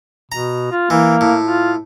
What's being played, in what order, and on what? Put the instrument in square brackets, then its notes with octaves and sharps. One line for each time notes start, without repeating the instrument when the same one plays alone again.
[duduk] B2 [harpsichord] A#5
[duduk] F4
[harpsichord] E3 [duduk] A#3
[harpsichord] A2
[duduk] F4